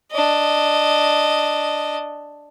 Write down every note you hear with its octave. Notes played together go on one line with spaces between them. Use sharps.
D4 D#5